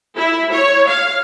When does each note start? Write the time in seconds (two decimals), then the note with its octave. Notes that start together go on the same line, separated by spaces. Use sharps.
0.17 E4
0.52 C#5
0.87 F5